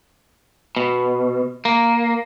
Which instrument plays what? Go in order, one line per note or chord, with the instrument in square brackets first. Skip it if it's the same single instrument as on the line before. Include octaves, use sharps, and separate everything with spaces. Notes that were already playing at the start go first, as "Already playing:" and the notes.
[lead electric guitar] B2
A#3